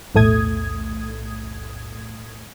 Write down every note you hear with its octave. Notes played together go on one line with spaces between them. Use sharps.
B1 E2 A2 A3 D#6 G#6